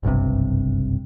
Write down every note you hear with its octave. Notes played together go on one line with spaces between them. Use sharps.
F#1 B1 G2 C3